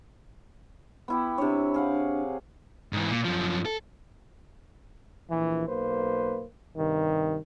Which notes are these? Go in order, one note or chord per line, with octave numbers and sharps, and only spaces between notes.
B3 E4 G4
C3 D4 C#5
G#4 F5 F#5
G#2 E3
A#2
F#2 F3
A4
A#1 E3
B1 A#3 B4 C5
G2 C3 D#3